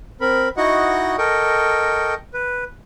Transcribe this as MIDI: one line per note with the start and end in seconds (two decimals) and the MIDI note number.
0.21 0.49 60
0.21 0.49 70
0.21 0.49 83
0.57 1.16 63
0.57 1.16 64
0.57 1.16 66
0.57 1.16 75
0.57 1.16 78
0.57 1.16 85
1.18 2.14 69
1.18 2.14 70
1.18 2.14 75
1.18 2.14 79
1.18 2.14 85
2.34 2.64 71